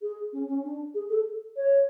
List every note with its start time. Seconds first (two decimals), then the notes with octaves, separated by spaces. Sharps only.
0.02 G#4
0.33 C#4
0.48 C#4
0.64 D4
0.94 G#4
1.10 A4
1.56 C#5